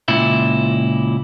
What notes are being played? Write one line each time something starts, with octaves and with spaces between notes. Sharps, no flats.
C#2 A#2 E4